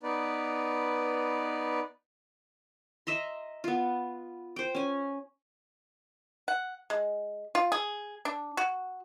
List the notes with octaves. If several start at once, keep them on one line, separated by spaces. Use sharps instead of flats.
B3 D#4 B4 D5
D#5 E5 A#5 C6
B3 F4
C5 G5
C#4 G#5
F#5
G#3
F4
G#4
D4
F#4